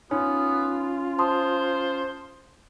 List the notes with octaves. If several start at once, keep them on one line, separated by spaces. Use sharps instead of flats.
B3 C#4 D#4 F4
C5 A5 C6 D#6